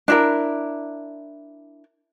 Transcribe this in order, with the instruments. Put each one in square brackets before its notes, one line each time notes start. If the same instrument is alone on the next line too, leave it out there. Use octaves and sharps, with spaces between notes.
[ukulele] D4 E4 A#4